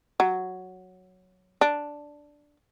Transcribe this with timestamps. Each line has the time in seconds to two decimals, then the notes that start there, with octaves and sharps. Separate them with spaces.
0.20 F#3
1.61 D4